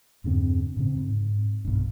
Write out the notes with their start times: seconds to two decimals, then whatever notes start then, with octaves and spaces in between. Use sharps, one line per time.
0.24 E2 G2 C#3 C4
0.77 A2 C#3 C4
0.96 G#2
1.65 B1 G2